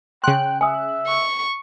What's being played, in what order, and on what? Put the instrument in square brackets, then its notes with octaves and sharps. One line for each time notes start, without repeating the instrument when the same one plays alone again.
[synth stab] C#3 F#6 [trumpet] G5 [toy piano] C6
[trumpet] E5 [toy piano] G#5 D#6
[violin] C#6